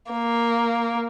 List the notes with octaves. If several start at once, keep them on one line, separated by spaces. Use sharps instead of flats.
A#3